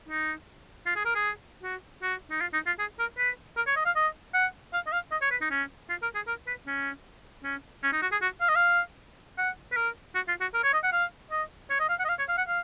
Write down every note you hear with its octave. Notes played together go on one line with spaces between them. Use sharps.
D#4
F4
G#4
A#4
G#4
F#4
F#4
D#4
F4
D#4
F4
G#4
A#4
B4
A#4
C#5
D#5
F5
D#5
F#5
F5
D#5
F5
D#5
C#5
B4
D#4
C#4
F4
A#4
G#4
A#4
B4
C#4
C#4
C#4
D#4
F#4
G#4
F#4
F5
D#5
F5
F#5
B4
A#4
F#4
F4
F#4
A#4
C#5
D#5
F#5
F5
D#5
C#5
D#5
F5
F#5
D#5
F5
C#5
F5
F#5
F5